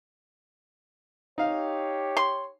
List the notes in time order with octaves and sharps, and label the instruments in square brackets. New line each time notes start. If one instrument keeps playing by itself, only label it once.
[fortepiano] D#4 F5 [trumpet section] G4 C#5
[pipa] C6